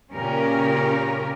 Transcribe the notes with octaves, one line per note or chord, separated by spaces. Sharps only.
A#2 C#3 C#4 G4 A#4